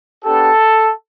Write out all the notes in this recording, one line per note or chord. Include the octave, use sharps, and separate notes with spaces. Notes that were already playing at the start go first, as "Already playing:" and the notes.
B3 D4 G4 A4